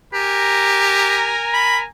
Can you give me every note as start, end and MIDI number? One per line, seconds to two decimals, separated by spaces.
0.14 1.35 67
0.14 1.86 70
0.14 1.86 80
0.14 1.86 82
1.53 1.78 83